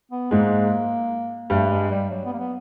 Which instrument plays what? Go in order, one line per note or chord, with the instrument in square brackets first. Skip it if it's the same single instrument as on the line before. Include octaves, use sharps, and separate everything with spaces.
[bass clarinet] B3
[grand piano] G#2 G#3 [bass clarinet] A#3
[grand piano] G2 G3 [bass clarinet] A3
[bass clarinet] G#3
G3
F#3
B3
A#3
B3